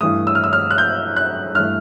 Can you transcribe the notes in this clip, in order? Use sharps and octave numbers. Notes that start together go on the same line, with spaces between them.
G2 E3 A3 D#6
E6
F6
E6
F6
F#6
G6
F#6
G2 E3 A3 F6